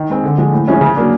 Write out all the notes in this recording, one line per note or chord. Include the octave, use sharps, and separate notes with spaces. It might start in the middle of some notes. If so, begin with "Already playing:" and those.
Already playing: D#3
G#3 C4
D3
F3 G#3
A2
F3 G#3 C#4 E4
C#3
F#3 A#3 D4